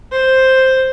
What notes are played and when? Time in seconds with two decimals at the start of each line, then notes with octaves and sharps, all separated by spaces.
0.12 C5